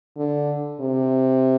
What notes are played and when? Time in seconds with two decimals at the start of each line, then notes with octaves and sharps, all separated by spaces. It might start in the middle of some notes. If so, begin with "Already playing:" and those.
0.17 D3
0.81 C3